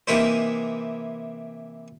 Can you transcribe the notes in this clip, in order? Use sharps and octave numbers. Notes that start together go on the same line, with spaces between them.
C3 E3 A#3 D#4 E4 C5